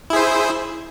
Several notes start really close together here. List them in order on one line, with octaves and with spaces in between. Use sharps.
E4 G#4 C5